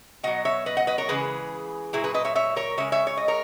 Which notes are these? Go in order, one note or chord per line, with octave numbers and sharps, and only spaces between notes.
B2 F#3 D#5 F#5
C#5 E5
B4 D#5
D#5 F#5
B4 D#5
A#4 C#5
C#3 E3 G#3 G#4 B4
A#2 F#3 E4 G#4
G#4 B4
B4 D#5
C#5 E5
C#5 E5
A#4 C#5
C#3 G#3 C#5 E5
C#5 E5
C#5
D#5
A#4 C#5